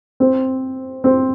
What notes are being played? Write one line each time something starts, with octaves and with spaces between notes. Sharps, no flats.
C4
C4